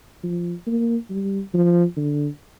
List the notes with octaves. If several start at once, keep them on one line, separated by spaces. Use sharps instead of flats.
F3
A#3
G3
F3
D3